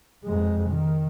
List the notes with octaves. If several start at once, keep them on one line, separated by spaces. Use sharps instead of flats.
F2 G#3
D#3